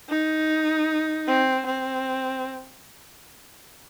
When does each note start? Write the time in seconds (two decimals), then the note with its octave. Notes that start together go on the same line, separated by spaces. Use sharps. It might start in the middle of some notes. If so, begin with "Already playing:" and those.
0.10 D#4
1.28 C4
1.66 C4